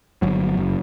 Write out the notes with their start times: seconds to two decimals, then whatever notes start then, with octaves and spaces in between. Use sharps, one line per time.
0.22 G1 F#3
0.57 F#1